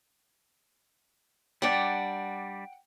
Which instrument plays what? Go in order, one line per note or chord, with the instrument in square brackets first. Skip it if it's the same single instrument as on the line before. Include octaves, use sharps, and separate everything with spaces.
[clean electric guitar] G3 D4 D5 [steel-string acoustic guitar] F#5 G5